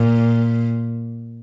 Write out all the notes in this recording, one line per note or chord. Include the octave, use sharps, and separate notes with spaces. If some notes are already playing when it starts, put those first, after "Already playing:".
Already playing: A#2